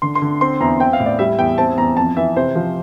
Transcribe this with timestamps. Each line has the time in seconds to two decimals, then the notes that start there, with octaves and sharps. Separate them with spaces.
0.02 D3 C6
0.15 C6
0.22 D3
0.41 C4 C6
0.60 E2 A#5
0.80 C4 G5
0.93 F5
1.00 A2
1.06 D5
1.19 G3 E5
1.38 E2 G5
1.58 C4 A5
1.78 E2 A#5
1.97 F2 A5
2.17 E3 E5
2.36 C3 C5
2.55 F3